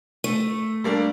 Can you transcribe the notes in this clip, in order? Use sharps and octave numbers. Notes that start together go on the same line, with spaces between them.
A3
G3 A#3 D4